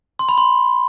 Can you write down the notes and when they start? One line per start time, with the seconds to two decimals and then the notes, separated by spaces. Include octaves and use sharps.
0.19 C6
0.29 B5
0.38 C6